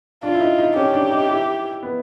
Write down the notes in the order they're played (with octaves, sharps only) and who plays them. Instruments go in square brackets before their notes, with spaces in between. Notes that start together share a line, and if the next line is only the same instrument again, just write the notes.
[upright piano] D4 [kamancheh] F4
[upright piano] E4
D#4
D#4
[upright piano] C#4 [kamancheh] G4
[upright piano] D4
D#4
E4
B3